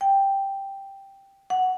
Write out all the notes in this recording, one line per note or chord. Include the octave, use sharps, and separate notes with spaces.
G5
F#5